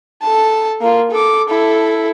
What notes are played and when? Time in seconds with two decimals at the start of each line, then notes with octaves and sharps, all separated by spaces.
0.22 A4 A5
0.81 A#3 F4
1.11 A4 D6
1.49 E4 A4